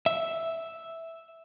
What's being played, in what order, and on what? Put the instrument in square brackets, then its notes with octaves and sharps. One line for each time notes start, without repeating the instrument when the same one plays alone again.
[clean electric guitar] E5